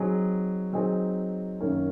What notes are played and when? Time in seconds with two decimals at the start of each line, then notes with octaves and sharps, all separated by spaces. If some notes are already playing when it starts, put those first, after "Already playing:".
Already playing: F#3 C4 D#4 G#4
0.73 F#3 C4 D#4 G#4
1.61 F#2 D#3 A#3 C#4